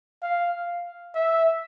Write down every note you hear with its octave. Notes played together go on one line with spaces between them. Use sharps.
F5
E5